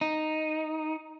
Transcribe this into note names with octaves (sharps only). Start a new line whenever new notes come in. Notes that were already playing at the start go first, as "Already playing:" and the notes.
D#4